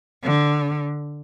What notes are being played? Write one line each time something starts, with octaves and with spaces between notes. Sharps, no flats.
D3